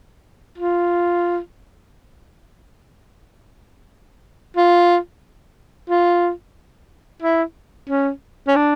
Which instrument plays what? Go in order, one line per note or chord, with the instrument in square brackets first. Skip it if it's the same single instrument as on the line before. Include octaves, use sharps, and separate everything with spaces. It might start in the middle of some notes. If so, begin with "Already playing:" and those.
[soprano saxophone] F4
F4
F4
E4
C#4
C#4
D4